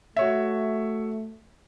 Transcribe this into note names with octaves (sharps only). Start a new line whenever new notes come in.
A3 F#4 C#5 E5